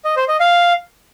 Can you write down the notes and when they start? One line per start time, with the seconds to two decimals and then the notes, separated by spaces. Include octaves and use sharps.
0.05 D#5
0.17 C5
0.28 D#5
0.40 F5